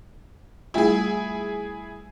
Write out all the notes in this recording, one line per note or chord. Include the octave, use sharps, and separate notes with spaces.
G3 A3 E4 F4 G#4